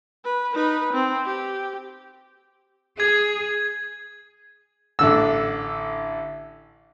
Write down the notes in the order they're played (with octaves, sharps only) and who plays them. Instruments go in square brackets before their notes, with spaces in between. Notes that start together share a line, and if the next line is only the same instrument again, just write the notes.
[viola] B4
D#4 B4
C4
G4
[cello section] G#4 [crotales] G#6
[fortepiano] A1 D3 E6